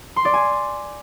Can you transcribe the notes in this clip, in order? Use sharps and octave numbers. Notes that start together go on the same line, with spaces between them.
C6
D5
G#5